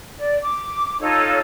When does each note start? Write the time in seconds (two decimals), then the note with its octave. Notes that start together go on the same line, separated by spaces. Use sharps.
0.17 D5
0.42 D6
1.00 D#4 F4 A4 C#5